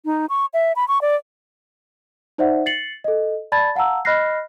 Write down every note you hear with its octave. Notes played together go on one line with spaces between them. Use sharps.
D#4
C#6
E5
B5
C#6
D5
D#4 C5 D5 E5 F#5
A6 C7 C#7 F#7
A4 D#5
D5 A5 B5 G#6 A6
F5 F#5 A5 A#5 E6
D#5 B5 F6 F#6 A#6 C7